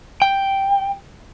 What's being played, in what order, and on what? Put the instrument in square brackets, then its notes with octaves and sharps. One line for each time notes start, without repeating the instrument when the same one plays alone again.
[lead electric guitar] G5